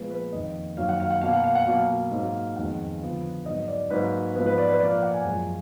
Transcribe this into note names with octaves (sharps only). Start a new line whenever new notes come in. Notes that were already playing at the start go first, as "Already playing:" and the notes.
Already playing: A#2 F3 G#3 B3 B4
B4
F2 D#3 A#3 D#5
F#2 D#3 F#3 A#3 F5
F#5
F5
F#5
B2 A#3 F5
F#5
F5
F#5
B2 F#3 A#3 F5
G#2 F#3 A#3
F2 D#3 G#3 B3 F#5
D3 F3 B3
G#2 F#3 B3 D#5
D5
G#2 F#3 A#3 B4
G#2 F3 B3 B4
B4
D5
B4
A#2 F3 A#3 D5
F5
F#5
G#5
F#2 F3 G#3